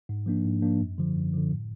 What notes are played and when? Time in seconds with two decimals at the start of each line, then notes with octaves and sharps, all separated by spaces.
0.09 G#2
0.26 F3 A#3 D4
0.45 G#2
0.62 F3 A#3 D4
0.80 F#2
0.98 D3 F3
1.16 F#2
1.33 D3 F3
1.51 A2